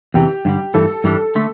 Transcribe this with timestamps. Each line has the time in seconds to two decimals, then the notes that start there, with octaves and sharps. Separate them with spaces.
0.14 E2 C3 E3 G4
0.45 G2 D3 G3
0.74 G2 E3 A3 A4
1.04 G2 E3 G3 D4
1.35 D3 A3